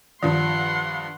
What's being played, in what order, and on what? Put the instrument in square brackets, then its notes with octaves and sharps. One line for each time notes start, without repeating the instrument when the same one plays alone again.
[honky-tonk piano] G2 F3 [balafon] D#3 [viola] F#5 C6